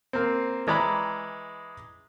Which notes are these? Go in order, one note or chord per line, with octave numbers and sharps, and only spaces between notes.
A#3 C4
E3 G#3 D5 A#5 B5